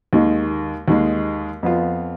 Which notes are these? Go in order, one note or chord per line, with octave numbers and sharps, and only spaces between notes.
D#2 D#3 G#3
D#2 D#3 G#3
F2 F3 B3 F4